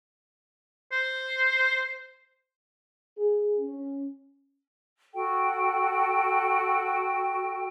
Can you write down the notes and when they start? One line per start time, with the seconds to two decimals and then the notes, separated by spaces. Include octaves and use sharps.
0.92 C5
3.17 G#4
3.58 C#4
5.14 F#4 A4 G5